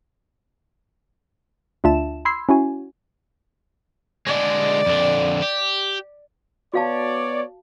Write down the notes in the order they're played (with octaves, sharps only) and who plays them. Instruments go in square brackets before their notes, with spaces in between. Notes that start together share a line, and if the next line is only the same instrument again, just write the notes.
[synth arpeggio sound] D2 D4 F4 E5 A5 E7
B5 C6 E6 G#6 C7
C#4 E4 F#4 G#5
[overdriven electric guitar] D3 G#3 [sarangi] D5
[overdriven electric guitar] F2 D3
G4
[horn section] B3 C#5 D5 [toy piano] F#4 F5 A5